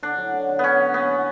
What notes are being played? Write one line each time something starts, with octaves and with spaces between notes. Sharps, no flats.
D3 D4
F#3
D3
D3
D3 B3 C#4
D3
A#3 B3
F#3